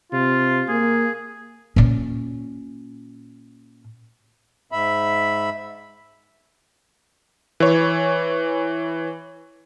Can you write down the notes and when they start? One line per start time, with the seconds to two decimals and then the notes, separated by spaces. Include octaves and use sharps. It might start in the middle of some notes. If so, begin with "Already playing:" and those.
0.12 C3 F4
0.68 A#3 G#4
1.76 A#2 C#4
4.72 G#2 E5 B5
7.60 E3 C#5